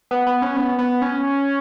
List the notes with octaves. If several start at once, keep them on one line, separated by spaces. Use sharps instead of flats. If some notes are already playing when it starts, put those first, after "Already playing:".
B3
B3
C#4
B3
B3
C#4